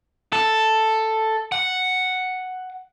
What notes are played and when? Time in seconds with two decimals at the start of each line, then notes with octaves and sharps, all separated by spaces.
0.33 A4
1.52 F#5